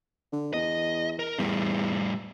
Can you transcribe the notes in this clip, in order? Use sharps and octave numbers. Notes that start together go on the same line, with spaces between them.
D3
E2 D#5
A#4
E2 A2 G3